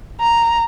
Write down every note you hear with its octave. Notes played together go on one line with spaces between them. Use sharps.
A#5